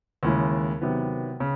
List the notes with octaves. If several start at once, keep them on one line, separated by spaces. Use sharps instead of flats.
D#2 C#3 E3 G#3
C3 D#3 F#3 B3
C#3